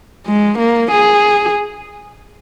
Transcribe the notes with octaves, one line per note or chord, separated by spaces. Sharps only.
G#3
A#3
G#4